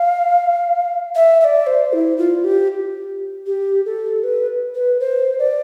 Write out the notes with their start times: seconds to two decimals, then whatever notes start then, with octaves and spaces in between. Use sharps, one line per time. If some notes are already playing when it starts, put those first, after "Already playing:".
Already playing: F5
1.15 E5
1.41 E5
1.44 D5
1.67 C5
1.93 E4
2.18 F4
2.44 G4
3.46 G4
3.86 A4
4.24 B4
4.75 B4
5.00 C5
5.39 D5